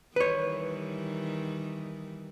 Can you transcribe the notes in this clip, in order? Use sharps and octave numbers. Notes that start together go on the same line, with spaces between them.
D#3 E3 G3 B4 C#5